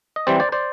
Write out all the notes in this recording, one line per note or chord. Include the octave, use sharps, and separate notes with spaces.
D#5
E3 G3 C4 C5 D5
C5 D5
C5 D5